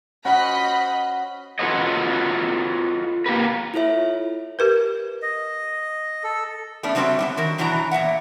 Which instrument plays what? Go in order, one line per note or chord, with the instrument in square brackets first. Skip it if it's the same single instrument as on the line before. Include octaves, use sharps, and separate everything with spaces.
[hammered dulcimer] C#4 F#4 [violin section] C5 D#5 B5
[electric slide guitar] F4 F#4 A4 B4 C#5 D#5
A#3 G4 A#4 B4
[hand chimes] E4 F4 A4 C#5 E5
[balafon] G4 A#4 B4
[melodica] D#5
A4
[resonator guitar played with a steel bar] A3 B3 C#4 D4
C#3 F#3 G3 C4 D5 E5
A2 D3 B3
D#3 F#4 A#4
F#2 B2 E3 F#3 D4 A#5
E2 A#2 E5 F#5